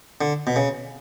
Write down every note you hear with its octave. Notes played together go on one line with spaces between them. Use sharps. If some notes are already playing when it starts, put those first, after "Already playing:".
D3
B2
C#3